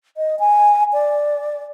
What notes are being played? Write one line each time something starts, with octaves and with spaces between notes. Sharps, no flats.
D#5
G#5
D5